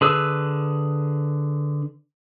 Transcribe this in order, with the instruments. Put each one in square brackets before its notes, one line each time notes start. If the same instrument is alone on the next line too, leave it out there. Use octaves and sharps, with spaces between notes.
[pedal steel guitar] D3 G#4 B4 E6